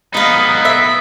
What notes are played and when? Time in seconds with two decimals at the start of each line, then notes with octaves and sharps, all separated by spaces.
0.14 B3 D#4 D#5 F5 B5
0.65 E5